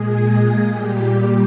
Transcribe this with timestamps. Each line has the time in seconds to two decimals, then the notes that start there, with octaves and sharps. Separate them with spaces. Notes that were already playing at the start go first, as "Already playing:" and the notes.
Already playing: A#2 G#3 G#4
0.67 A#2 G3 G4
1.14 G4